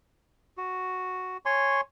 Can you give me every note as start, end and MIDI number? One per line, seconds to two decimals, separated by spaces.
0.57 1.37 66
1.45 1.81 73
1.45 1.81 80
1.45 1.81 84
1.45 1.81 85